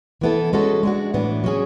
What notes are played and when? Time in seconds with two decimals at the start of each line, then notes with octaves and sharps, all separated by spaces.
0.21 E3 B3 E4 A4
0.53 G#3 C#4 F#4 A4
0.83 G#3 D4 F#4
1.14 A2 E3 B3 D4
1.44 F#3 C#4 G#4